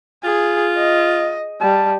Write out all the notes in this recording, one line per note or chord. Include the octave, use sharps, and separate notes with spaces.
F4 G#4
D#5
G3 A5